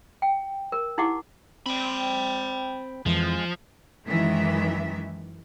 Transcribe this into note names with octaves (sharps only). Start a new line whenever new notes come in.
G5
A#4
D#4 E4 G4 F#5 D6
C4 G5 B5
F2 E3 F3 G#3
F#2 D#3 E3 G#3 E5